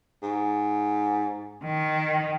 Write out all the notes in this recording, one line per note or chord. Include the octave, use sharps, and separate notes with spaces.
G#2
D#3